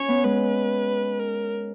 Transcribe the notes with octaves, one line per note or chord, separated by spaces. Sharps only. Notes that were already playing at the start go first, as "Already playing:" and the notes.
Already playing: C#4 C#5
B3
G#3 B4
A#4